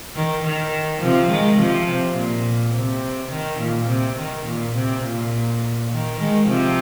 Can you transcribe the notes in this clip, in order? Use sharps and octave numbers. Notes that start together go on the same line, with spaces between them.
D#3
D#3
C3 F3
D#3 G#3
C3 F3
C3
A#2
C3
D#3
A#2
C3
D#3
A#2
C3
A#2
D#3
D#3 G#3
C3 F3